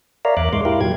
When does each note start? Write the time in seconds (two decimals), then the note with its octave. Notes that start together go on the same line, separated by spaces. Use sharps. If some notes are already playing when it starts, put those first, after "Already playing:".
0.25 A#4 C#5 D5 E5 F5 A#5
0.37 E2 E5 D6 F#6
0.53 G#2 G#3 C6 D6
0.65 E4 G4 A#4 F5
0.81 A#2 F#3 G#6